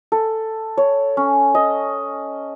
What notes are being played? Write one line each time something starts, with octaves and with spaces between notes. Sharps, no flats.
A4
C#5
C#4
D#5